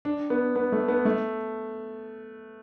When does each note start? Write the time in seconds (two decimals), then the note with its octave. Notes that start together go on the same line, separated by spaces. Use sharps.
0.05 D4
0.30 B3
0.56 B3
0.72 A3
0.88 B3
1.05 A3